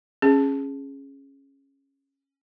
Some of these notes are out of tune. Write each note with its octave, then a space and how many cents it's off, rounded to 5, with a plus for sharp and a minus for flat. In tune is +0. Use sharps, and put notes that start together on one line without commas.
C#4 -15 G#4 +0